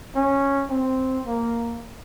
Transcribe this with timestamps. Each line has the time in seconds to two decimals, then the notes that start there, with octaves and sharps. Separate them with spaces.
0.15 C#4
0.70 C4
1.25 A#3